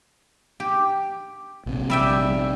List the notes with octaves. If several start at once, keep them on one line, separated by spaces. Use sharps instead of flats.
G4
A#1 C3
G3 E5 G5